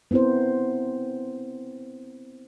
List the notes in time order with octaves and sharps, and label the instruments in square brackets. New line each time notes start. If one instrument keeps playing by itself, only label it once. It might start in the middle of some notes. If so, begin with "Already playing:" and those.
[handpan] B3 C4 E4 A#4 C5